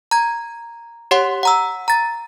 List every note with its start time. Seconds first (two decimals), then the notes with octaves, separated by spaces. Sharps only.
0.11 A#5 G#6
1.11 G4 C#5 F#5 C6
1.43 F#5 A#5 E6
1.88 A#5 A6